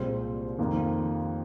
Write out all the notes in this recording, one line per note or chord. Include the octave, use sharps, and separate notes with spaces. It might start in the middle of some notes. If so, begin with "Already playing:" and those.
Already playing: C2 A#2 G#3 C4
F2 D#3 A#3 F4